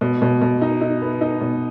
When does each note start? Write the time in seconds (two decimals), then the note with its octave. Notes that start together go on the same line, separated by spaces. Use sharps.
0.01 B2
0.22 B2
0.41 B2
0.62 D#4
0.81 D#4
1.02 B3
1.21 D#4
1.41 B2